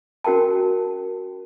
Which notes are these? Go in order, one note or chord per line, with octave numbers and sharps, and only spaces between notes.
C#4 F#4 A#4 G5 A5